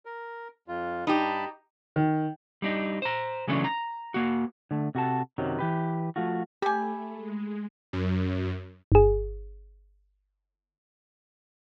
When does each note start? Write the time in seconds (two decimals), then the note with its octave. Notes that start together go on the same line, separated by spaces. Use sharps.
0.05 A#4
0.68 F2 F4
1.07 G2 D#4 G4 A5 B5
1.96 D#3
2.62 G3 D4 D#4
3.02 C5 A#5
3.47 C#3 E3 F#3 A3 C#4 D4
3.64 A#5
4.14 A#3 F#4
4.71 D3 A3
4.95 C3 F#4 A4 A5
5.38 F#2 C3 D#3 F#3
5.59 E3 G4 B4
6.16 F3 A3 F4 F#4
6.62 A3 G4 G#5 B5
7.17 G#3
7.93 F#2
8.92 G1 G#4